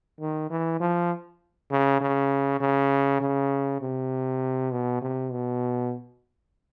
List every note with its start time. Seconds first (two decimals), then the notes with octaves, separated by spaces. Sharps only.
0.20 D#3
0.50 E3
0.80 F3
1.71 C#3
2.01 C#3
2.60 C#3
3.21 C#3
3.81 C3
4.71 B2
5.01 C3
5.31 B2